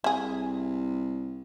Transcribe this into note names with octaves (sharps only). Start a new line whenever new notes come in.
C2 E4 G#4